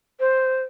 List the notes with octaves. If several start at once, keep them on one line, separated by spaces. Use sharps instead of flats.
C5